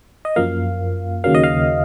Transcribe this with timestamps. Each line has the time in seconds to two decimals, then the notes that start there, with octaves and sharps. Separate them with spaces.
0.25 D#5
0.36 F#2 F3 A#3 F5
1.24 D#2 C#3 F#3 A#3 F5
1.35 D#5
1.44 F5